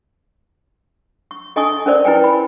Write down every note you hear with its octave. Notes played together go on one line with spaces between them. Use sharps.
C#6
A4 D#5 G#5 A5 C#6 D#6
C#4 A#4 C5 D5
E4 B4 G5 G#5
B5